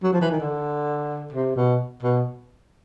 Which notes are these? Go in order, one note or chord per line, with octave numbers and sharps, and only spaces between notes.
F#3
F3
E3
D#3
D3
C3
B2
B2